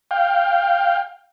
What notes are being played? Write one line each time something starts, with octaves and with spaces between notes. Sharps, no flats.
F5 G5